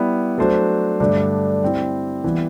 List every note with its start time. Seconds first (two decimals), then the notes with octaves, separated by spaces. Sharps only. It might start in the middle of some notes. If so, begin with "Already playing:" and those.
Already playing: G3 B3 E4
0.38 F#3 A3 D4 F#4 C5
1.00 G2 D3 A3 D4
1.63 G3 C4 E4
2.24 E3 G3 B3